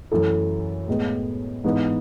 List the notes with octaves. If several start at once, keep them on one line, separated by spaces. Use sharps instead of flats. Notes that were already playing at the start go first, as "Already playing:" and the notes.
F#2 E3 A3 E4 A4
A2 G#3 B3
G#2 E3 B3